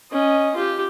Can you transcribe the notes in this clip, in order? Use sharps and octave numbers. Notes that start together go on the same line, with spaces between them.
C#4 D#5
F4 G4